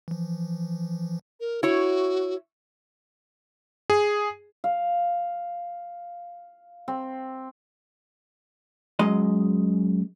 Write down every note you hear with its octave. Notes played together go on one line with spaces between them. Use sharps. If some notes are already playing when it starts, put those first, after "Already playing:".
E3 F3
A#4
E4 F#4 C#5
G#4
F5
C4
F#2 G#3 D#5